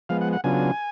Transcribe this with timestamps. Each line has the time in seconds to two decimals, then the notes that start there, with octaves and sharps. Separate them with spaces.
0.09 F3 G#3 B3 F5
0.21 F#5
0.33 F#5
0.44 C#3 F#3 B3 D4 F4 G#5